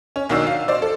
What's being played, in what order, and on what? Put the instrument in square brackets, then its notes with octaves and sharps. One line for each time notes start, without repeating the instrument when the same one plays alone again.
[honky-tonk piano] C#4
B1 D#3 D4 F#4 E6 C7
F5
C5 D5
A4